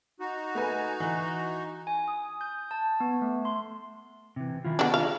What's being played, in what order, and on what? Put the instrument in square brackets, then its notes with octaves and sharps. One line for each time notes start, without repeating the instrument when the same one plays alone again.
[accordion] D#4 F#4
[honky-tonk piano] A3 B4 G#5
E3
[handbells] G#5
D#6
G6
A5
B3
A3
C6
[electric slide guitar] C3 E3
D#3 E4 F4
[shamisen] B3 D4 [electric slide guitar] F4 G#4 D#5
[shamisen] F5